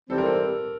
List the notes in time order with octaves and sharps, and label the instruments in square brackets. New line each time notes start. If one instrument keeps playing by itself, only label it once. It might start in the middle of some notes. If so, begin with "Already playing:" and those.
[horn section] G#2 E3 G3 C4 [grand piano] A4
[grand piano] A#4
A4